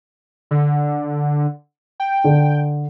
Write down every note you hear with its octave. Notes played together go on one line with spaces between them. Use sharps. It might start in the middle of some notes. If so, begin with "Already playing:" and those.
D3
G5
D3